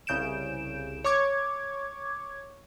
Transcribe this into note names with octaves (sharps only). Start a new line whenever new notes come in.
C2 C#3 G6 D7 E7
C#5 C#6 D6 G#6